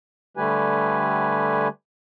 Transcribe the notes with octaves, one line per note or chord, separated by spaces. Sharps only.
D3 G3 A3 G4 B4 G#5